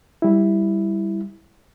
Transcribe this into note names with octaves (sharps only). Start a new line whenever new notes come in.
G3 E4